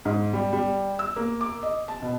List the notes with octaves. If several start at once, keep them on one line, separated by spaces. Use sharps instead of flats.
G#2
G3
G3
E6
A#3
D6
D#5
A5
B2